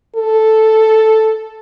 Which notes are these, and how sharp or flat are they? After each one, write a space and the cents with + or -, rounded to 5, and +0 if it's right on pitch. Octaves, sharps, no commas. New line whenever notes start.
A4 +0